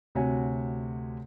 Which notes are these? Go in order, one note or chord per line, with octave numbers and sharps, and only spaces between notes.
D2 C3 F#4 C#5 G#5